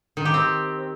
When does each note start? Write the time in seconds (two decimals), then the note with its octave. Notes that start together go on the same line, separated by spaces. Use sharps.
0.17 D#3
0.25 G4
0.34 C4